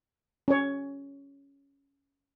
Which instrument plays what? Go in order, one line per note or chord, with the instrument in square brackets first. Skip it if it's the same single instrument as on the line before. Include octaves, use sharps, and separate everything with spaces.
[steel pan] C#4 C#5